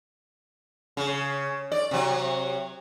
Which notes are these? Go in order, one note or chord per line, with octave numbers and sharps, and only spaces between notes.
C#3
D5
C3 F#3